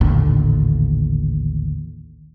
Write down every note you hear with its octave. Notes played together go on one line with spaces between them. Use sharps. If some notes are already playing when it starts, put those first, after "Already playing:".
A1 D#2 A#2 D3